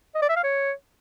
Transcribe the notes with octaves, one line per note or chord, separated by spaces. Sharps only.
D#5
D5
E5
F5
C#5